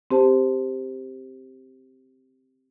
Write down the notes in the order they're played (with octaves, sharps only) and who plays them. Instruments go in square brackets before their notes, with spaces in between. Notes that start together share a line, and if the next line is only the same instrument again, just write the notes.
[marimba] C4 G4 C5 A5